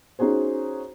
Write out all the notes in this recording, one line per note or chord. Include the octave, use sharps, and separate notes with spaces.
C#4 D#4 F#4 G#4 C5